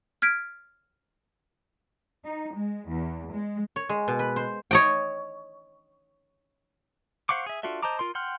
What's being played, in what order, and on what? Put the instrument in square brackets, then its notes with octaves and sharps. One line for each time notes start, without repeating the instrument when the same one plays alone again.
[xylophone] F6 G#6 B6 D7
[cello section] D#4
G#3
E2
G#3
[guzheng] C#5
G#3
B2
B4
C5
C#5 D#5 G5
[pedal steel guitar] C5 F5 F#5 C#6 D6
G#4 E5
D4 F4 F#4 A4 E5
C5 D#5 A5 A#5 D6
F4 A#4 C6
F#5 G5 C6 F6